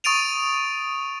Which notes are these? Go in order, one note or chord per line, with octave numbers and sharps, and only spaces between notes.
C#6 D#6 A6 D7 D#7 F7